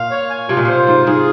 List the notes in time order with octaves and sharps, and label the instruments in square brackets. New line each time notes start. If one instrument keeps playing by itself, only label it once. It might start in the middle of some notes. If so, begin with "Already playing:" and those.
Already playing: [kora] A#2 [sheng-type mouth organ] F5
[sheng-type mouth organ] C#5
G#5
[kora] C3 [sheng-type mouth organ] F4
[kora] A#2
[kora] C3 [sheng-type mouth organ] C5
[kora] G#2 [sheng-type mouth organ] F4
[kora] G#2 [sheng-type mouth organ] G#4